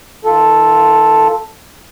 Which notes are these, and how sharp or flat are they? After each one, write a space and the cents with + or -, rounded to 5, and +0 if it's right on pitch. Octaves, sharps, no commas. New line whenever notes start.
D#3 +40 F4 +0 A4 +0